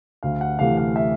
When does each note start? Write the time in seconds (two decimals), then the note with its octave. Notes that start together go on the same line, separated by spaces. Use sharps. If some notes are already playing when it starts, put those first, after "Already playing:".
0.23 D2 F5
0.41 F#5
0.59 C3 E3 A3 F5
0.77 F5
0.96 E5